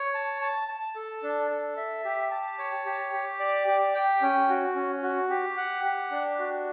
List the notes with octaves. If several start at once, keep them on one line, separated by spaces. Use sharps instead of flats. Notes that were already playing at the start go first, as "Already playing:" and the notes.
Already playing: C#5
A5
A5
A5
A4
D4
A4
E5
G4
A5
C#5
G4
G4
D5
G4
G5
C#4
F#4
C#4
F#4
G4
F#5
G4
D4
F#4